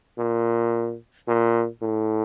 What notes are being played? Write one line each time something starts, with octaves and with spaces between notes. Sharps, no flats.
A#2
A#2
A2